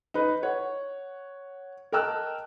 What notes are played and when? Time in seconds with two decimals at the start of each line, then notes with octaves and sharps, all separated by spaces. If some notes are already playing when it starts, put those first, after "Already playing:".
0.14 D#4 B4
0.43 C#5 F#5
1.92 A#4 D#5 G5 A5 E6 F#6